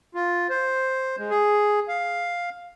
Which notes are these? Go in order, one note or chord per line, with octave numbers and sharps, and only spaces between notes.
F4
C5
G#3
G#4
F5